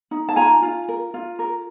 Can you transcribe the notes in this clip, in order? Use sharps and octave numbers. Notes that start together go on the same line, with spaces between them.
D#4
A5
F4 G#5 A#5
F4
A#4
F4
A#4